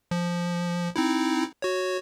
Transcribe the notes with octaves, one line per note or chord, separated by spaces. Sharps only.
F3
C4 D#4 E4
F#4 C#5